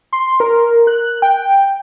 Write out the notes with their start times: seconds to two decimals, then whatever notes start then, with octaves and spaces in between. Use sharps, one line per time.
0.13 C6
0.40 A#4
0.87 F#6
1.22 G5